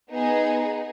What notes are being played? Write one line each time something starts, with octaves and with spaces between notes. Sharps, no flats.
B3 D#4 G#4